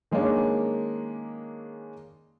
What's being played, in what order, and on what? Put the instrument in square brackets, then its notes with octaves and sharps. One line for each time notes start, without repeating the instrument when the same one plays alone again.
[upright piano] D#3 G#3 A#3 C#4 D4